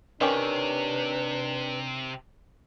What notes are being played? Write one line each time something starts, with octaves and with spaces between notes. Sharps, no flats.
C3 D#3 C#4 D4 G4 B4